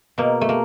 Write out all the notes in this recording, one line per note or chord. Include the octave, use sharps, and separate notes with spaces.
B2 A#3
A3
A#3